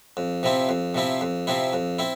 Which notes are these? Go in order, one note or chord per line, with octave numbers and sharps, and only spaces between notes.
F2
C3 F3 C4 E4
F2
C3 F3 C4 E4
F2
C3 F3 C4 E4
F2
C4 E4